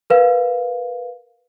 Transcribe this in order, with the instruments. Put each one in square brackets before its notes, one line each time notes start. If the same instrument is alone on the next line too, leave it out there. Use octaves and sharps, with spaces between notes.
[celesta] A#4 B4 F5